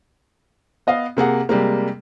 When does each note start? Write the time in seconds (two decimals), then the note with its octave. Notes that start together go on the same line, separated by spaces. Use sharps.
0.87 B3 D#5 F5
1.17 C3 A#3 G#4 F#5
1.49 C3 G3 G#3 A#3